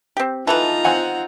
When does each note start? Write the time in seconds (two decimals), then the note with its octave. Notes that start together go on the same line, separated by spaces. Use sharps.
0.17 C4 G4
0.47 E3 D#4 F4 A4 B4 A5 A#5
0.84 C4 F#5 G#5